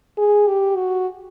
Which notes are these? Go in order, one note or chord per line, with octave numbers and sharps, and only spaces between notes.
G#4
G4
F#4